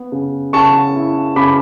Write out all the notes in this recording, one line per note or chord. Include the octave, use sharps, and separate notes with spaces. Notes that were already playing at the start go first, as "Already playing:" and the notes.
Already playing: B3
C#3
C#3 A5 C#6
E4
C#3 B5 D6